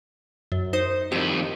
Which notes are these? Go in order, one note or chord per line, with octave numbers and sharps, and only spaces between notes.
F#2
D#4 C5 D#6
F2 D#3 G4